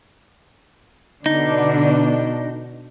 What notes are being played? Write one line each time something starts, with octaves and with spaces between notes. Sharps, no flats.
B2 D3 D4 D#4